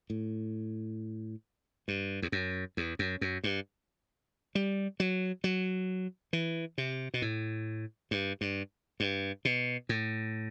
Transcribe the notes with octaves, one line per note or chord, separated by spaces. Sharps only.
A2
G2
E2
F#2
E2
F#2
F#2
G2
G3
F#3
F#3
E3
C3
B2
A2
G2
G2
G2
B2
A2